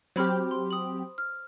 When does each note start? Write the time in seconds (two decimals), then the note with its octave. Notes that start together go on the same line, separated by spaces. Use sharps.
0.16 F#3 C4 G4 C5 B5 F6
0.51 C6
0.71 D#6 F#7
1.18 F6